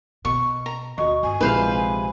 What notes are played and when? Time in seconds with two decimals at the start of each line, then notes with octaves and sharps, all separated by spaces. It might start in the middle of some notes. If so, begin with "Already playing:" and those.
0.25 B2 C#6
0.66 A#5
0.98 D2 F#4 D#5 C#6
1.23 G1 G#5
1.41 A#1 C3 G#3 E4 B4 C5 F5